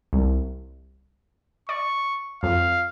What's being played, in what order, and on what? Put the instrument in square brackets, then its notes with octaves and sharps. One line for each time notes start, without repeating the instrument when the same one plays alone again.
[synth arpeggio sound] C2
[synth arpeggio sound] D5 [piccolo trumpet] C#6
[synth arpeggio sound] F2 [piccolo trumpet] F5